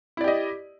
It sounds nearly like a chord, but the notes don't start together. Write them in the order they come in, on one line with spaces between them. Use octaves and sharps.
E4 D5 G4 D#5